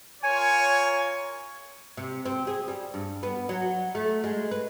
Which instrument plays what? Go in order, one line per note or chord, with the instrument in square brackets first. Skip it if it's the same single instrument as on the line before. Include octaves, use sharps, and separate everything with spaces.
[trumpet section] F4 A#4 C#5 [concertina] G#5
[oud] C3
C4
G#4
G3
G2
B3
F#3
A3
G#3
B4